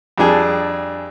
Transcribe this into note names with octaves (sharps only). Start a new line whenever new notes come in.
F2 G3 D4 G#4 A5